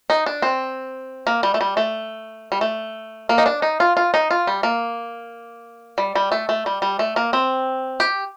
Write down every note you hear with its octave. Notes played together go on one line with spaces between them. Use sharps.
D#4
D4
C4
A#3
G3
A3
G3
A3
G3
A3
A#3
D#4
D4
D#4
F4
F4
D#4
F4
G3
A#3
G3
G3
A3
A3
G3
G3
A3
A#3
C4
G4